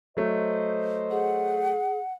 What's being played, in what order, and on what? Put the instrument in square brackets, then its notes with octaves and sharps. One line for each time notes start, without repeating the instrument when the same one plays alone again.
[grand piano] F#3 A3 [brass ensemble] C5 D#5
[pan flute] G#4 [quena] F#5